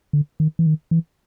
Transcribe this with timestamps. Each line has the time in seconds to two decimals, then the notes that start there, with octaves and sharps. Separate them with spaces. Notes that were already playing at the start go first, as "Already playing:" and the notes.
0.13 D3
0.40 D#3
0.59 E3
0.66 D#3
0.91 E3